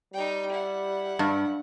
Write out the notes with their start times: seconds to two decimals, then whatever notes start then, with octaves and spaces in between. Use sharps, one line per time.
0.14 G3 D#4 G5
0.51 E4 F#5
1.19 G2